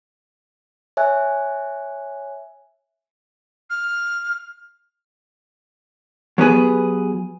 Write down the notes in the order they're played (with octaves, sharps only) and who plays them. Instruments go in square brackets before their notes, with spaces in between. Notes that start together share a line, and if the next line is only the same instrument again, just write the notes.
[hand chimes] C#5 E5 G#5 F#6
[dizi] F6
[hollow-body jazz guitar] F#3 B3 G4 G#4 B4